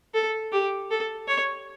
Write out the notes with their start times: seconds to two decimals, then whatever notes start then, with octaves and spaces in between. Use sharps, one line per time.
0.14 A4
0.52 G4
0.91 A4
1.28 C#5